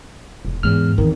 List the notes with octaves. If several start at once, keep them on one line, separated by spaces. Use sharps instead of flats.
E1
E2 G#2 F6
E2 D#3 C4